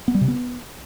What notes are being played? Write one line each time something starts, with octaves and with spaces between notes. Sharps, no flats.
B3
G3
C3
B3